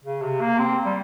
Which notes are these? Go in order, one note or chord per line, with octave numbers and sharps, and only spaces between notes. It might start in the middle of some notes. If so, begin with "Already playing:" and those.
C#3
C3
A#3
C4
G3